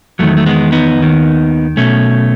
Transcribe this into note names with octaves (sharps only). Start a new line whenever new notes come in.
E2 D#3 F#3 A3
A3
G#3 B3
B3 D#4
D#2 D#3
B1 B2 A3 C#4